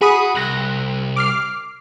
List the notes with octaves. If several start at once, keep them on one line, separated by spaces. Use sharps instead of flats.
F#4 G#4 B5 D#6
C2 F#6 A#6
D6 F6 C7